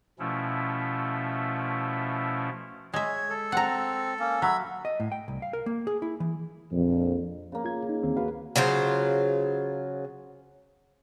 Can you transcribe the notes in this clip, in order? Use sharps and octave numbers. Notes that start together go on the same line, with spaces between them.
B2 F3 A3 C#4 E4
G#3 C#5 E5
A4
C4 F#5 A#5
A#3 C#4
F#3 E5 B5
D#5
A2
G5
C2
F5
A#4
A#3
G#4
E4
E3
A#1 F2
C#3 A#3
F4 G#6
D#4
D2 D#3 C4
F#4 B4 F5
C#3 F#3 F4 C5